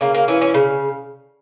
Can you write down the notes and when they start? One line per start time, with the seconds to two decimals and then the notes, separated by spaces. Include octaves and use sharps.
0.01 C#3 A#3
0.14 A#3
0.28 E3 C#4
0.41 C#4
0.54 C#3